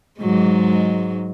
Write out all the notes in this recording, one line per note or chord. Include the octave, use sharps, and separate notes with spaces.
G#2 F#3 G#3